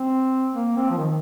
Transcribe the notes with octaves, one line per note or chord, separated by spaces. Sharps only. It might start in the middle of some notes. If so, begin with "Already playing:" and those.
Already playing: C4
A#3
C4
F3
D#3